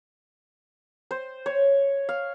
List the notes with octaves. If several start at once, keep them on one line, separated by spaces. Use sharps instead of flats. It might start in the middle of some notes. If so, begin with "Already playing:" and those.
C5
C#5
F5